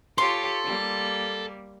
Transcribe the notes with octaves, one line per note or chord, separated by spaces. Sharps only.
F4 G4 A4 C#5 C6
G3 A#3